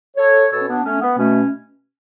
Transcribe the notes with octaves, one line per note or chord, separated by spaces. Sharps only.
A4 C#5
B2 A4 C#5
C#4
B3 D4
A3 C#4
B3
B2 A3 C#4